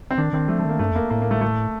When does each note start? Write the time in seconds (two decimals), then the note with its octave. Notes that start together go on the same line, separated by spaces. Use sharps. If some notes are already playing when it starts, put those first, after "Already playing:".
0.11 C4
0.18 D#3 D4
0.33 D#3 C4
0.48 F3 A3
0.59 A3
0.65 D#3 A#3
0.79 G2 A3
0.91 F2
0.95 A#3
1.10 A2 A#3
1.22 A#3
1.31 A3
1.41 A3